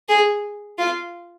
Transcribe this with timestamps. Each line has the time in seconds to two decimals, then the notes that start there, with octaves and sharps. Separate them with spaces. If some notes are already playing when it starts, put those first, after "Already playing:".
0.09 G#4
0.78 F4